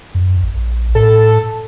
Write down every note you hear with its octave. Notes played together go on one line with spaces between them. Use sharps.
F#2
A#1
A2 A4